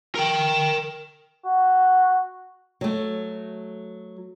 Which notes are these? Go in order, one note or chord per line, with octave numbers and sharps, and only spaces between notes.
A#4 G5
F#4
F#3 A3